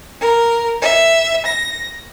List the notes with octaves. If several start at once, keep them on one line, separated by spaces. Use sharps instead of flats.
A#4
E5
A#6